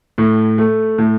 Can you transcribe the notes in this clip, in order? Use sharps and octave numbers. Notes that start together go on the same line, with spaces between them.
A2
A3
A2